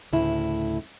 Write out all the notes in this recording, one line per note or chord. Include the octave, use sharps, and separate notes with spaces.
D2 A2 C#3 E4